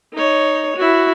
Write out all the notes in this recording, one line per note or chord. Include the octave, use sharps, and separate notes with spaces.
D#4 C#5
E4 F#4